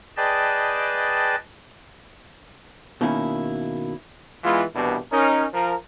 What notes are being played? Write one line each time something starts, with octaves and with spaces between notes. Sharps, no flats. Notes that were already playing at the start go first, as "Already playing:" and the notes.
G#4 B4 D5 D#5 G5 A5
B2 D#3 A#3 C#4 E4
E3 G#3 B3 E4 F4
C2 B2 E3 B3 D4 G4
C#4 D#4 A#4
F3 A#4